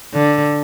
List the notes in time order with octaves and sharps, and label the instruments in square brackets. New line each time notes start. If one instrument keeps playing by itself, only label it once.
[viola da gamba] D3